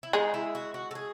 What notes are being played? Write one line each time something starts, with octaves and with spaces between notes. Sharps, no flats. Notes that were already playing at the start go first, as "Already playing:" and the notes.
E4
G#3 D#4
E4
F#4
F#4
A4
G#4